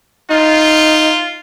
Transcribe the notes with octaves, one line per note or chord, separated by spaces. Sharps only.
D#4 F4